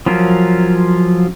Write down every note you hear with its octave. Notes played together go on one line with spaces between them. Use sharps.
F3 F#3 C#4 F4 A#4